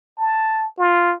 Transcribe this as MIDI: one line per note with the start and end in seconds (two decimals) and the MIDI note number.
0.18 0.69 81
0.79 1.15 65